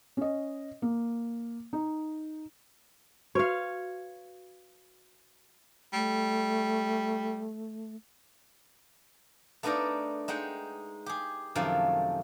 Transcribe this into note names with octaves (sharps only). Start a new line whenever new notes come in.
C#4 D#5
A#3
D#4
F#4 B4 C#5 F5
G3 A3
A3 B3 D4 D#4 A#4 D5
G#3 D#4 F#5 G5
G4 G#4
F#2 C3 D#3 F3 A3 F5